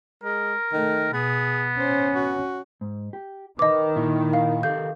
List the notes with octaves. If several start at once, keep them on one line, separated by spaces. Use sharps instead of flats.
G#3 A#4
D#3 A3
B2 B3 G#4
C#4 C5
F#4
G#2
G4
D#3 B4 D#5 D6
A#2 E4
F5
G4 A4 F5 G6